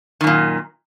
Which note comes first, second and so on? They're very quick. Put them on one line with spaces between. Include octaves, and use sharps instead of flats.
D#3 F#2 A#2